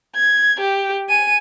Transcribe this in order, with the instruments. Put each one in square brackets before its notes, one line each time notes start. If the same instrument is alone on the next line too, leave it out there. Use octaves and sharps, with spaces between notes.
[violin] G#6
G4
G#5 D#7